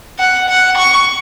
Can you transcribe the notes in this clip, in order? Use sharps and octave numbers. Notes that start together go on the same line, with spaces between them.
F#5
F#5
C#6